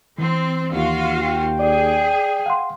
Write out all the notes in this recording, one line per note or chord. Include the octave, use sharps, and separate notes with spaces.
E3 C4
D#2 F4 F#4 F5
G5
G#4 D5
F5 F#5 C6